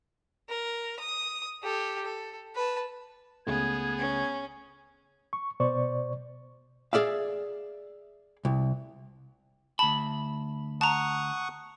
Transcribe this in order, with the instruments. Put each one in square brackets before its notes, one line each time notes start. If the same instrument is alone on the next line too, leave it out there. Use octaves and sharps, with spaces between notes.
[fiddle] A#4
D#6
G4 A4
A4
B4 A5
[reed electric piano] C#2 C#3 A3 [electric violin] B3 G#4 [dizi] G#6
[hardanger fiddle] C#4 [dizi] G#6
[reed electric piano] C#6
B2 C5 D5 C#6
[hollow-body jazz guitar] G#4 D5 E5 F5
C2
[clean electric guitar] D2 B5 [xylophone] A5
[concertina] F#5 C#6 D#6 [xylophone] A5 A#5